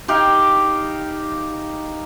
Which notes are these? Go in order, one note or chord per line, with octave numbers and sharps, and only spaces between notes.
D#4 G4 F5 G5